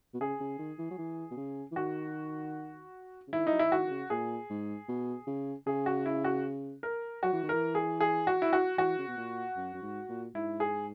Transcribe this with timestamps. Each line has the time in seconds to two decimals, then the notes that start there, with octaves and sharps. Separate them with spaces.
0.14 B2
0.20 C#3 G#4
0.40 C#3
0.59 D#3
0.79 E3
0.91 F#3
0.98 E3
1.31 B2
1.37 C#3
1.72 E3
1.76 D#3 F#4
3.28 C#3
3.33 D#3 E4
3.47 F#3 D#4
3.59 E3 E4
3.71 D#3 F#4
3.87 D#3
3.91 C#3
4.10 A#2 G#4
4.50 G#2
4.88 B2
5.27 C#3
5.67 C#3 G#4
5.86 F#4
6.06 E4
6.24 F#4
6.83 A#4
7.23 F#3 F#4
7.33 E3
7.43 D#3
7.49 E3 A#4
7.75 G#4
8.01 G#4
8.27 F#4
8.42 E4
8.53 F#4
8.78 E3 F#4
8.98 C#3
9.08 B2
9.17 A#2
9.56 F#2
9.74 F#2
9.82 G#2
10.09 A#2
10.35 G#2 E4
10.60 G#4